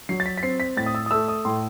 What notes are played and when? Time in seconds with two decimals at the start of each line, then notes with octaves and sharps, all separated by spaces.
0.09 F#3 C7
0.20 A6
0.26 B6
0.38 B6
0.43 C4 C7
0.60 B6
0.77 A2 A6
0.86 D#6
0.95 E6
1.06 D#6
1.11 A3 E6
1.28 D#6
1.45 A2 C6